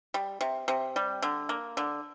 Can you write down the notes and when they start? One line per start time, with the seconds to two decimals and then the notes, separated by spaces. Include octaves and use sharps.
0.14 G3
0.41 C3
0.68 C3
0.96 G3
1.22 D3
1.49 A#3
1.77 D3